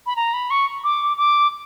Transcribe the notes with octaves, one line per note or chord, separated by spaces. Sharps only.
B5
A#5
B5
C#6
D6
D6